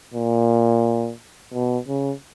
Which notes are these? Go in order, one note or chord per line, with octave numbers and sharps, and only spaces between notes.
A#2
B2
C#3